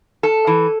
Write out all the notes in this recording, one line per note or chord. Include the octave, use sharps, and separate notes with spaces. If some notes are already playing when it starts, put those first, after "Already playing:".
A4
E3